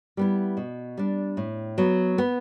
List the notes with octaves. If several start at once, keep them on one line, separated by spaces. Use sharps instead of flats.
G3 B3 E4
B2
G3 D4
A2
F#3 B3
B3